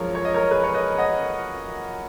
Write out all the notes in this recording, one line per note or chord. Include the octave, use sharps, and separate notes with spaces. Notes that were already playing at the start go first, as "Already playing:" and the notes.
Already playing: F#2 F3 G#3 A#4 C#5
C#5
D#5
A#4 C#5
G#4 B4
C#5
B4 D#5
D#5 F#5